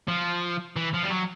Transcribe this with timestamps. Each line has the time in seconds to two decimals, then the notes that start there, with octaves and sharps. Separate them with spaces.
0.08 F3
0.76 E3
0.94 F3
1.03 G3
1.10 F#3